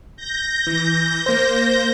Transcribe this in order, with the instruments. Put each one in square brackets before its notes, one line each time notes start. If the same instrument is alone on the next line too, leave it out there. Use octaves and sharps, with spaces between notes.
[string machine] G6 A#6
[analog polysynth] E3
A#3 C5